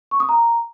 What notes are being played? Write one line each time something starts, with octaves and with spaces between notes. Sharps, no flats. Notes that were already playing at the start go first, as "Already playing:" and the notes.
C#6
D#6
A#5